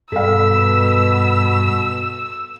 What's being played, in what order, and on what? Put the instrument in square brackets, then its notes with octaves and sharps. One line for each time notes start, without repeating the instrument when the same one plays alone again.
[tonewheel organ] G2 B5 [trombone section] B2 [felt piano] A4 F5 [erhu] E6